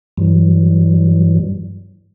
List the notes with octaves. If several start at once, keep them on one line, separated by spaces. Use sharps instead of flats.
G2 E3 F#3 G3